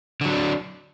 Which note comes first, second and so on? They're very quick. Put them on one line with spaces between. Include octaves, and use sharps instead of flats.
D3 F#3 D4